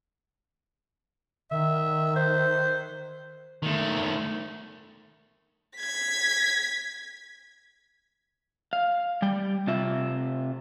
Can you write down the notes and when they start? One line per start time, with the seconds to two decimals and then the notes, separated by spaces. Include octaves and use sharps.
1.51 D#3 E5
2.16 C5
3.63 D#3 A3
5.77 G#6 B6
8.73 F5
9.22 G3 G5
9.67 C3 F4 E5